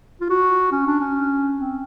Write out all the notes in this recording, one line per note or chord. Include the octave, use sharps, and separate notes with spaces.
F4
F#4
C#4
D4
C#4
C4